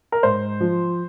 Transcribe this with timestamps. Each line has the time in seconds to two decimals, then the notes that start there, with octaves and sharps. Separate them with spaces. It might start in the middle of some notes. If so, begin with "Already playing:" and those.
0.12 A#4
0.23 G#2 C5
0.61 F3